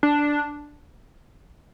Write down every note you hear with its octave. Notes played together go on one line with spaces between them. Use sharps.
D4